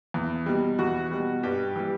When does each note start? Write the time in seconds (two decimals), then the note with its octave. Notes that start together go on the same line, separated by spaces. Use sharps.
0.14 E2
0.46 B2 G3
0.79 E2 F#4
1.11 B2 G3
1.43 G2 G4
1.76 E3 G3